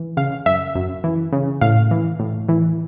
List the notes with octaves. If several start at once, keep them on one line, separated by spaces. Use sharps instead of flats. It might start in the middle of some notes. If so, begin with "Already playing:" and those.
Already playing: E3
C#3 F5
F#2 E5
F#2
E3
C#3
A2 F5
E3
A2
E3